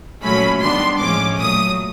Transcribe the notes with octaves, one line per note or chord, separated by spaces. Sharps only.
A#2 F#3 A3 C#4 B5
D#3 G3 B3 D4 C6
A2 F3 G#3 C#4 D6
A#2 F#3 A3 D#6